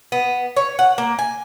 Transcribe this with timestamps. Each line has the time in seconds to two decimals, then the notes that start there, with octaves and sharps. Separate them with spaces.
0.12 B3
0.56 C#5
0.79 F#5
0.98 A#3
1.19 G#5